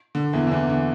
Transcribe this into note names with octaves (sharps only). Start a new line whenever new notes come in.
D3
E2 E3
D3
E2 E3
D3